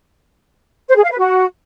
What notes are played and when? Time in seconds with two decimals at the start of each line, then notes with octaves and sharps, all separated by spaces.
0.88 C5
0.96 G#4
1.03 F5
1.11 B4
1.19 F#4